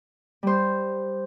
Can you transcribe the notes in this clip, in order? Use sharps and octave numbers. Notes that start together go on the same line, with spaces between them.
G3 C5